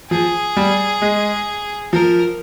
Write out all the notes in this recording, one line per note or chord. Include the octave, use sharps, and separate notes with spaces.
F3 G#4
G3
G#3
F3 A#4